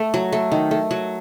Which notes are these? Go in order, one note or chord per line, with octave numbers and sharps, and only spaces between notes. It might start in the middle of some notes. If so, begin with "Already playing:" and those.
Already playing: A3
F#3
A3
D#3
A3
F#3